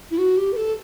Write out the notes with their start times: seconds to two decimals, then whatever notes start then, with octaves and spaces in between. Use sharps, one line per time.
0.11 E4
0.18 F#4
0.37 G4
0.53 B4
0.56 A4